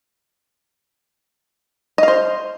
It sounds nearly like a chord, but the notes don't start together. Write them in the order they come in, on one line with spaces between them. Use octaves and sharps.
D#5 F5 C5